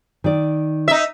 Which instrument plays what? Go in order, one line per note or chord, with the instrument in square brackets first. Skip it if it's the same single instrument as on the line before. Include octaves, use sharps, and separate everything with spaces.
[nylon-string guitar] D#3 D5
[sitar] D#4 E5